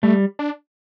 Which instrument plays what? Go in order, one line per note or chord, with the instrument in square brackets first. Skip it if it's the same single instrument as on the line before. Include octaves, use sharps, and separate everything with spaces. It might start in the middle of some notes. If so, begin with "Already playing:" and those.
[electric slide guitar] G3 [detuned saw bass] A3
[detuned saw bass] D4